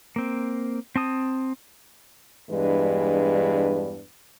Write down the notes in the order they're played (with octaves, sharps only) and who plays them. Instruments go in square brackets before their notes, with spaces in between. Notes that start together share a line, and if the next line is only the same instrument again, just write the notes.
[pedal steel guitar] A#3 C4
C4 A5 D#6
[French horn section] E2 G2 E3 G#3 D4 B4